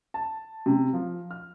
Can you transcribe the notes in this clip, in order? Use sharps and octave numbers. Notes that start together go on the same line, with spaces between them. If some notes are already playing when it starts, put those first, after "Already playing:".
A5
C3
F3
F6